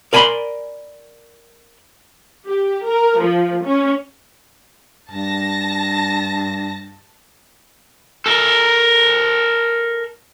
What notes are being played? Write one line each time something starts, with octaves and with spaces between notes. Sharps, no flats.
A#4 D5 G#5 A5 B5 C6
G4
A#4
F3
C#4
G2 A5 A#6
A4 A#4